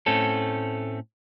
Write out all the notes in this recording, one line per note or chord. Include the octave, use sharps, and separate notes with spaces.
A2 A3 C4 C#4 A4